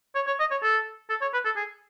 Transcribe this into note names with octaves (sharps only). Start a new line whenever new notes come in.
C#5
C#5
D#5
C#5
A4
A4
C#5
B4
A4
G#4